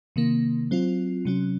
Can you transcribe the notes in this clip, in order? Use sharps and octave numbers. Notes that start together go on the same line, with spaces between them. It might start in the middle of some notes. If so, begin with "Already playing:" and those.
C3 D#3 A#3
F#3 C4 F4
C3 F#3 C#4